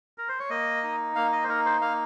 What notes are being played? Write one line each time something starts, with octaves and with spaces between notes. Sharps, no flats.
A#4
C5
C#5
A#3 D#5
D#4
A#3 F5
D#5
C5
D#4 A#4
C5
A#3 F5